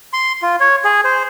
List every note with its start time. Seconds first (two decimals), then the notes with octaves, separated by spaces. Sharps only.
0.13 C6
0.42 F4
0.60 C#5
0.85 G#4
1.04 C5